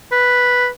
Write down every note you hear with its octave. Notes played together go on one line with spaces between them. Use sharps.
B4